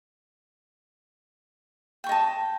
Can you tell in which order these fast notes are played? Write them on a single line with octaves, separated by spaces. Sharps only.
G5 C#6 D#5 A5